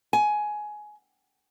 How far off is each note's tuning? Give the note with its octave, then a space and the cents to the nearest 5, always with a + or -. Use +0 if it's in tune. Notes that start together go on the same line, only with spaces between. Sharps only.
G#5 +15